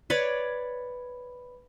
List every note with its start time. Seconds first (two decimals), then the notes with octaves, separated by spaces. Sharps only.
0.10 B4 C#5 D5